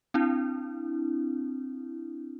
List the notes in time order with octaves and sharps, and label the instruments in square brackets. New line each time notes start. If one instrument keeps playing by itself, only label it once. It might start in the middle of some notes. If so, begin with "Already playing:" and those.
[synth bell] C4 D4 E4